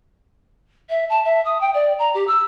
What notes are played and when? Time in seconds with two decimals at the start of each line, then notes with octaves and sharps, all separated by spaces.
0.90 E5
1.10 A5
1.25 E5
1.45 D#6
1.61 G5
1.74 D5
1.99 A#5
2.15 G4
2.27 E6